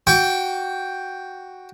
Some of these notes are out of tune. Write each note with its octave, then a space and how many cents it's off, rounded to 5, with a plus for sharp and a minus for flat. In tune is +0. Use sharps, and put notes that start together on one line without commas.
F#4 +0 G5 +0 D6 -45